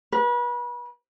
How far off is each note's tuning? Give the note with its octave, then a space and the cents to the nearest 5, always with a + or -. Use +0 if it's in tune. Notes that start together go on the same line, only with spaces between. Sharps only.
B4 -35